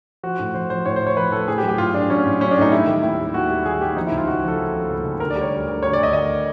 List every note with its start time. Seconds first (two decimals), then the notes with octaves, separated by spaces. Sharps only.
0.23 F3 F#4
0.39 A2
0.55 F3 C5
0.70 F3 C5
0.85 A2 C#5
0.96 C5
1.01 A2
1.07 C#5
1.17 F3 B4
1.32 A2 A4
1.48 A2 G#4
1.58 G4
1.63 F#3
1.69 G4
1.78 A2 F4
1.94 A2 D4
2.10 F#3 C#4
2.25 A2
2.41 F#3 C#4
2.51 D4
2.57 A2 D#4
2.72 G3 E4
2.87 D#3
3.03 D#2 E4
3.19 G3
3.34 D#2 F#4
3.50 G3
3.65 D#2 G#4
3.81 D#2 G4
3.97 F3 D#4
4.07 E4
4.12 C#2
4.18 F4
4.27 C#3 F#4
4.43 F3 A4
4.59 C#3
4.74 F3
4.90 C#2
5.05 C#2
5.20 D2 A#4
5.30 D5
5.36 G3
5.41 C#5
5.52 D2
5.67 D2
5.83 D2 C#5
5.93 D5
5.98 D2 D#5
6.13 D2 D#5